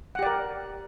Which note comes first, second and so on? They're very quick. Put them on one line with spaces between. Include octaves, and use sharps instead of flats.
F#5 G4 D5 A#4